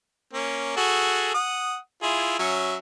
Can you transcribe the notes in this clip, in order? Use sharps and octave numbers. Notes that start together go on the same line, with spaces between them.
A#3 C#4
F#4 G#4 A4
F#5 D#6
E4 F4 G#4
F#3 C#4 E5